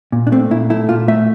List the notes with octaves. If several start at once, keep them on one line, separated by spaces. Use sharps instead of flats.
A#2
D4
A3 C4
A#2 E4
A3 E4
A#2 F4
A3 E5